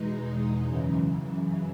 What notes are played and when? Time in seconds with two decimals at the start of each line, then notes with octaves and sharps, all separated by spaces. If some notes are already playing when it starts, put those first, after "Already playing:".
Already playing: E2 B2 G#3 D#4
0.67 F#2 C#3 E3